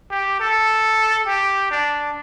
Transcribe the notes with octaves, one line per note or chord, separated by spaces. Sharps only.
G4
A4
G4
D4